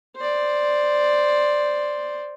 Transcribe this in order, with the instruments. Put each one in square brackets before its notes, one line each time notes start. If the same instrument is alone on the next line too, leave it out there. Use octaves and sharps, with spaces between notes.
[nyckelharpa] C5 D5